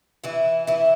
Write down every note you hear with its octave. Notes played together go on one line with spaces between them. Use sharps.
E3 E4
E3 E4